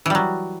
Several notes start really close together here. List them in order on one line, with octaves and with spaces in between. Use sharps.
E3 G3 F#3